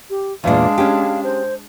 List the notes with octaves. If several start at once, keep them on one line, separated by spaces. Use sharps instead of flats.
G4
E2 A#2 G#3 D4 F5
C#4 G4
C5